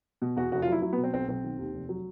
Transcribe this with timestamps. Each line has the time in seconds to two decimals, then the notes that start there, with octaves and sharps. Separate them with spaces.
0.22 B2
0.36 E2 F#4
0.52 F1 F#4
0.62 F4
0.68 F#3 E4
0.82 F#3 E4
0.93 B3
0.97 B2
1.04 C4
1.14 B1 C4
1.28 B1 C4
1.44 D#3
1.59 D#2
1.74 F1
1.89 F#3